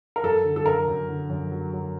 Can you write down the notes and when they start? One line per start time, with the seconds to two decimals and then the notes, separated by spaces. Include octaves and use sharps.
0.16 A#4
0.23 F#2 A4
0.44 D3
0.56 A4
0.66 F#2 A#4
0.88 F#2
1.08 D3
1.30 F#2
1.51 F#3
1.73 F#3